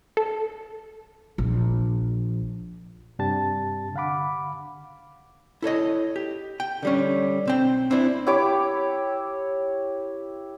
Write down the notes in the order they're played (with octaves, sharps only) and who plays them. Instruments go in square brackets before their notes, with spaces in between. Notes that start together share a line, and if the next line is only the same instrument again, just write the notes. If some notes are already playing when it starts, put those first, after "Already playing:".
[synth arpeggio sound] A4
[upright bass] A#1
[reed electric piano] G2 C3 D4 G4 A5 A6
D3 F5 F#5 B5 D6
[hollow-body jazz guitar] E4 A4 C#5 D#5
G4
G5
D3 G3 C#4
B1 C4 G5
C4 D4 E4 C5
[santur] E4 G4 C#5 D6